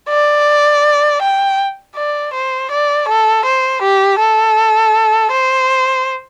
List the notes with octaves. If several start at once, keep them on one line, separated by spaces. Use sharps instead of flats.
D5
G5
D5
C5
D5
A4
C5
G4
A4
C5